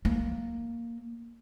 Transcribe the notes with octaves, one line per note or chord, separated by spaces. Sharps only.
A#3